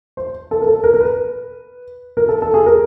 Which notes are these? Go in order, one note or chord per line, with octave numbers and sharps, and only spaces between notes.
C5
A4
A#4
A4
A#4
A#4
B4
A#4
A4
A4
G#4
A#4